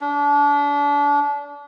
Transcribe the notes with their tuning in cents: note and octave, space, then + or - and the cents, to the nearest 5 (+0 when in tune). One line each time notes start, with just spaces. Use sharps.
D4 -30